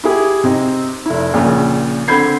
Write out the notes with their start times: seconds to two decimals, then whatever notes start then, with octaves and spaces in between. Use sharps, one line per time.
0.04 E4 G4 G#4
0.44 C3 C4 D#4
1.06 F1 E4
1.34 A#1 A#2 C#3
2.08 D3 C4 B5 G6 G#6 C7